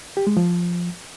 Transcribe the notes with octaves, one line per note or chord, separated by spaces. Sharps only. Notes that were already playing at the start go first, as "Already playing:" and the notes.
G4
G#3
F3